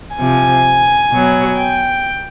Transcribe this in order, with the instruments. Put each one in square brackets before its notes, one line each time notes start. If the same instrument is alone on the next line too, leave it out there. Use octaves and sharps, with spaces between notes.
[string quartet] C3 F3 G#5
B2 F#3
G5